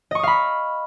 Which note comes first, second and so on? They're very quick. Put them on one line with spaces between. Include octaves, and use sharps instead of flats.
D#5 C#6 D#6 F5 B5